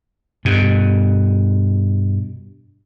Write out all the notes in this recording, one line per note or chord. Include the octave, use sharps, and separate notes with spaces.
G2 B2